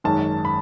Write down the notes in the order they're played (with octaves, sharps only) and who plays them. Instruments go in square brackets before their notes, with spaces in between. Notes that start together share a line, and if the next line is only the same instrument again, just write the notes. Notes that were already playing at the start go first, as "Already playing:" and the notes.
[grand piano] G#1 F#2 D#3 G#3 C#4 A5
B5